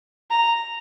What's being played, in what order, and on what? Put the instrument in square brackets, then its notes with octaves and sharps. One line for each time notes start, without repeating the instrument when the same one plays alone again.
[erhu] A#5